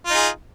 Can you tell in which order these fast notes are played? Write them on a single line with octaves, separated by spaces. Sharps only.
F4 D#4 G#4